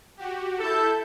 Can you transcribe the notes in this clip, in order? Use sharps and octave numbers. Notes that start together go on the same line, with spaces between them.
F#4 G4
E4 A4 G6